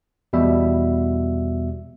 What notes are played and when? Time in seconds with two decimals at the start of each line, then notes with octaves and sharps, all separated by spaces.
0.33 E2 B2 G3 E5